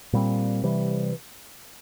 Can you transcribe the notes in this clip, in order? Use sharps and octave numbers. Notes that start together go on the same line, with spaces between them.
A#2 G3 C4
C3 E3 G3